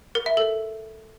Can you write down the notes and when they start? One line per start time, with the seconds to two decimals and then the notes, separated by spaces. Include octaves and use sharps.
0.15 A#4
0.26 E5
0.37 A4